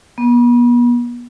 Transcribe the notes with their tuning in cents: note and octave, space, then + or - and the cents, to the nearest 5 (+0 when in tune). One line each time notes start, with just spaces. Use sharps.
B3 -40